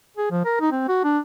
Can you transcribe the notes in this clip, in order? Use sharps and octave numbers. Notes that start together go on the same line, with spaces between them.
G#4
F3
A#4
D#4
C4
F#4
D4